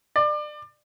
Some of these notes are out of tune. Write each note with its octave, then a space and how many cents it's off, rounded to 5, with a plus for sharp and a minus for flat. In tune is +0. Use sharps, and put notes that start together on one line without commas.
D5 +30